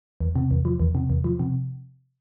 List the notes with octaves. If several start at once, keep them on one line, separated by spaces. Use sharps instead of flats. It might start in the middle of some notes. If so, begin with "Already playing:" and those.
E2
C3
E2
F3
E2
C3
E2
F3
C3